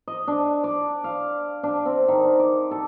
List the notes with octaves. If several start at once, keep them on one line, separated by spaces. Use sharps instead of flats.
D#5
D4
D5
F5
D4
C4
D#3
D6
A4